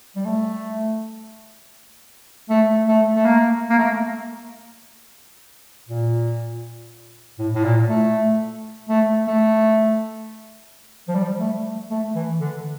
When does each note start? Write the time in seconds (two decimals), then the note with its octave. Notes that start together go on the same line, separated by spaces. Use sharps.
0.16 G3
0.25 A3
2.50 A3
2.88 A3
3.15 A3
3.25 A#3
3.70 A#3
3.78 A3
3.85 A#3
5.89 A#2
7.39 A2
7.55 A2
7.64 A#2
7.89 A3
8.89 A3
9.27 A3
11.08 F3
11.15 G3
11.40 A3
11.91 A3
12.15 E3
12.40 D3